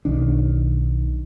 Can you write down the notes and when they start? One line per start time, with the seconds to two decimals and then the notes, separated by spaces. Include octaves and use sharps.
0.05 B1 D#3 D4